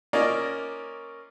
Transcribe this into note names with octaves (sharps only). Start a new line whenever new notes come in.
A#3 C#4 F4 A#4 D5 D#5